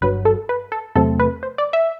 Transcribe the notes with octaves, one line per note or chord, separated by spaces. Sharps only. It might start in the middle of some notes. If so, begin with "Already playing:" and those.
G1 G2 F#3 B4
A4
B4
A4
E2 C3 F#3 A3 C4 A4
B4
C5
D5
E5